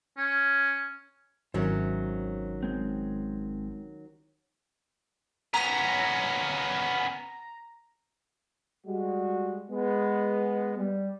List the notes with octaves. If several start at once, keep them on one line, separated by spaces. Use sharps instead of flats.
C#4
G#1 D#3 F#3 C#4 C5 C#5 E5
G#3 C4
B3 C#4 A#5
G3 G#3 F#4
G#3 B3
G3